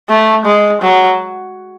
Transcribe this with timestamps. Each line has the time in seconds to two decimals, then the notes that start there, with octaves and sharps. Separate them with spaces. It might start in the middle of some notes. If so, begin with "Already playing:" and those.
0.09 A3
0.45 G#3
0.81 F#3